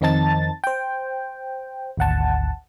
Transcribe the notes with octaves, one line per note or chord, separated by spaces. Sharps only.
F2 D#3 C4 D#4 A5 A6
C5 G5
G#1 D2 F#5 A5